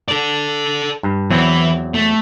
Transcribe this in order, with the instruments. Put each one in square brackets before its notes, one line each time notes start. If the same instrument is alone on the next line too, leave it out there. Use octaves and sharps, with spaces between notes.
[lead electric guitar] A4 D5
[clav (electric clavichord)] G2
[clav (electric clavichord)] E2 F#3 C4 [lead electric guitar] E3
[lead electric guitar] A3